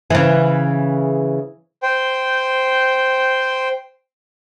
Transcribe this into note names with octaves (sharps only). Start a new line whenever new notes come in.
C#3 E3
C5 G5